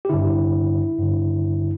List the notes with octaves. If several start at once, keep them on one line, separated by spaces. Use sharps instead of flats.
G4
G2 D3 E4
G2 D3